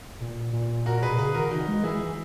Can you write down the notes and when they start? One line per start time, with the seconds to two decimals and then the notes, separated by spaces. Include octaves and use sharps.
0.21 A#2
0.53 A#2
0.86 A#2 F#4 A#4
1.02 B2 G#4 B4
1.18 C#3 G#4 B4
1.35 D#3 F#4 A#4
1.51 E3 D#4 F#4
1.68 G#3
1.84 E3 E4 G#4
2.00 E3